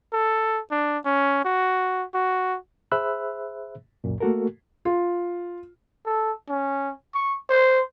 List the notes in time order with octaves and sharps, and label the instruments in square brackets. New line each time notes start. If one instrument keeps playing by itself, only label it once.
[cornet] A4
D4
C#4
F#4
F#4
[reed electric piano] G#4 C5 E5 B5 E6 F#6
C#2 F#2 A#2
A3 A#3 F#4 A4 A#4
[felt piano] F4
[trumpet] A4
C#4
C#6
C5